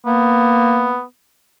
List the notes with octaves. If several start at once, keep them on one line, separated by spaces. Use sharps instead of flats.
A#3 B3